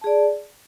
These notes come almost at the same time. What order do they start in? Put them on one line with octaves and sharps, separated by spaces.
A5 G#4 D5